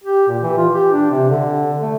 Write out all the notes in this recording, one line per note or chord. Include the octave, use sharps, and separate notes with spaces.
G4
A#2
E3
F4
G4
D4
C3
D3
A3